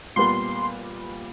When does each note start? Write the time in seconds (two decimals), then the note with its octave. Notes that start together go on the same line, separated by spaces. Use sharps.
0.16 A#2 G3 B3 C6